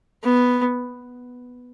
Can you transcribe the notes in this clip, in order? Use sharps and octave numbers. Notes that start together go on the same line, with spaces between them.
B3